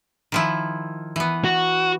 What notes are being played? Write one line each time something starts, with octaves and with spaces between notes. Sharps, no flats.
D#3 F3 E4
E3 B3
F#4